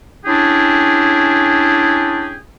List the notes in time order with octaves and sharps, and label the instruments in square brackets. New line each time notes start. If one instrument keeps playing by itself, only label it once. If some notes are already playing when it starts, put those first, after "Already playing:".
[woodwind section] C#4 D4 E4 G4 G#4